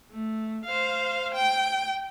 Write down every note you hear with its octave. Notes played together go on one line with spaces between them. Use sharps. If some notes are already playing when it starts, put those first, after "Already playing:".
A3
C5 F5
G5